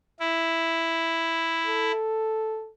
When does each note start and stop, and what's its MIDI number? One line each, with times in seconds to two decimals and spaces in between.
0.20 1.92 64
1.66 2.70 69